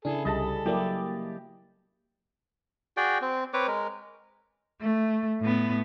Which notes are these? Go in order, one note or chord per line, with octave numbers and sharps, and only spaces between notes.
C#3 D4 E4 G#4 A4
C2 G3 G#4 A4 D#5 A5 B5
F#3 A#3 E4 G4 D5
F#4 G#4 D5 G5
C4
C4 B4 C#5 D6
G#3 A#4
A3
A2 B3